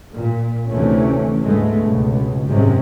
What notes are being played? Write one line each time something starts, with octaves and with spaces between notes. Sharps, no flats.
A#2
D2 C3 E3 A3 C#4
D2 G#2 G#3 A3 B3
C#2 B2
G#1 F#2 C3 G#3 C#4